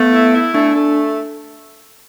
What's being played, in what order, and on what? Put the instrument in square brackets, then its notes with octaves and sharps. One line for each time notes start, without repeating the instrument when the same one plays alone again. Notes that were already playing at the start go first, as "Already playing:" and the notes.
Already playing: [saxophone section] A3 [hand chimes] B3
[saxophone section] E4
E4
[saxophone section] A3 [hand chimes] D4
[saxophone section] A3